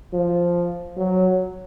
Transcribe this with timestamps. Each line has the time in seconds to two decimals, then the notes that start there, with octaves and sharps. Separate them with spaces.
0.14 F3
0.97 F#3